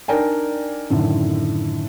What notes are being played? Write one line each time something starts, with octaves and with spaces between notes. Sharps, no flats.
D4 D#4 A#4 D5 G5 G#5
F#2 A2 D3 D#3